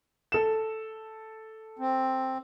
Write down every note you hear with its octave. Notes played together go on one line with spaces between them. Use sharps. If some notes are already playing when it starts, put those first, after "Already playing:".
A4 E7
C4